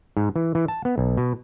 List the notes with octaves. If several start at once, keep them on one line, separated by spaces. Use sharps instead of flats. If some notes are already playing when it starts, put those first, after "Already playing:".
G#2
E3
E3
A5
B3
B1
B2